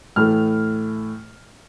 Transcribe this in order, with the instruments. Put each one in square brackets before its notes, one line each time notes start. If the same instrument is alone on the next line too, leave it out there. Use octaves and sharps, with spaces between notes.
[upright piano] A2 E3 A3 F6